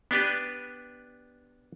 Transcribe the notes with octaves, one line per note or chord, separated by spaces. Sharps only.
B3 D4 G4 B4